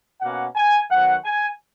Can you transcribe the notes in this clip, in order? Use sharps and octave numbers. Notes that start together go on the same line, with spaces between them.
B2 A#3 C#4 F#5
G#5
D#3 F#3 B3 F#5
G#5